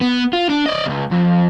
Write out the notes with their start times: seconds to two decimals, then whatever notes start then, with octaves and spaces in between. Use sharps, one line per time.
0.01 B3
0.33 F4
0.50 D4
0.66 D5 D#5
0.86 C#2 C3
1.12 F2